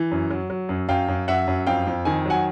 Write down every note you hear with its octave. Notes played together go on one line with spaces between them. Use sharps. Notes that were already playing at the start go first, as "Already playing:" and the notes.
Already playing: E3
F#2
F#3
F#3
F#2
F#2 F5 G5
F#2
F#2 E5 F#5
F#2
F2 F5 G5
F2
D#3 G#5
F#3 F#5 G#5